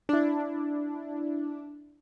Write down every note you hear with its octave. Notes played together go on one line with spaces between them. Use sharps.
D4 E4